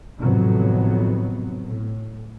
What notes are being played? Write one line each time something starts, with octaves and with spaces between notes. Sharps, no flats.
G#1 F2 A2 C3 F#3 B3
A2